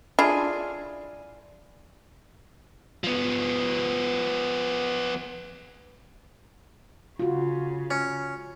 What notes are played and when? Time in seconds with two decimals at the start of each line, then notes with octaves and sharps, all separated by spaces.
0.19 D4 E4 F4 G#4
3.04 F3 B3
7.19 C#3 F4 F#4
7.91 C#4